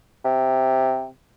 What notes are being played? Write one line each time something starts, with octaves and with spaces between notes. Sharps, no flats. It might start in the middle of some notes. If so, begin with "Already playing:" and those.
C3